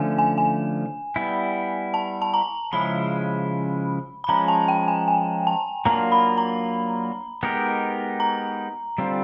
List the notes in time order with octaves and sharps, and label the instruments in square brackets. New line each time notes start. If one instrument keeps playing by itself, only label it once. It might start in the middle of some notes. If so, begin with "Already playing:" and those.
Already playing: [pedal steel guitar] D3 F3 A3 C#4 [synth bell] G#5
[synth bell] G#5
G#5
[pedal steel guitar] G3 B3 E4
[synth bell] A5
A5
A#5
[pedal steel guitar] C#3 F3 G#3 C#4 E4 [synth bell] B5
[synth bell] B5
[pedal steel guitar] F3 G#3 C#4 [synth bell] A#5
[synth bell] A5
G5
G#5
G#5
A5
[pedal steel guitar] F#3 A#3 D4 F4 [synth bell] A#5
[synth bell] B5
A#5
[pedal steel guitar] G#3 B3 D#4 G4 A#4
[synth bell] A#5
[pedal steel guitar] D3 G3 C4 F4